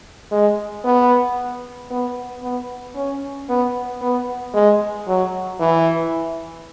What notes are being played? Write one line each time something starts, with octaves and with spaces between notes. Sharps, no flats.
G#3
B3
B3
B3
C#4
B3
B3
G#3
F#3
E3